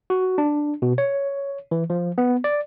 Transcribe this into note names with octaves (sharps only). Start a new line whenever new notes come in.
F#4
D4
B2
C#5
E3
F3
B3
D5